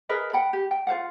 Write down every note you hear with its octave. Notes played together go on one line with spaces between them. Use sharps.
G#4 A#4 B4 D#5
F#5 G5 B5
G4
G5
F4 C5 F5 F#5